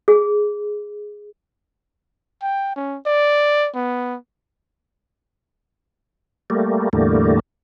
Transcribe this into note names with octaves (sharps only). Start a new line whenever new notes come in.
G#4
G5
C#4
D5
B3
G3 A3 A#3
E2 A2 D3 G3 A3 A#3